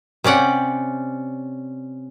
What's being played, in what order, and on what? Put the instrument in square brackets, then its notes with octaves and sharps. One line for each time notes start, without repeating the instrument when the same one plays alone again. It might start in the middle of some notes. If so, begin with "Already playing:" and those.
[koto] C3 C#4 D5 F#5 G5